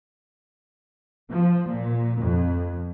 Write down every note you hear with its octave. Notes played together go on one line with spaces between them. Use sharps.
F3
A#2
F2